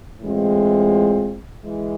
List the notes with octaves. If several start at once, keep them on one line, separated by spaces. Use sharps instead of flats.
A2 E3 G#3 C4 F4
E3 G#3